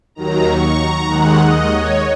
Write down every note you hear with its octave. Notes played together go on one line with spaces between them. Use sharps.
D#2 D#3 F#3 A#5
C#6
A#5
D#2 D#3 G#3 F#5
D#5
C#5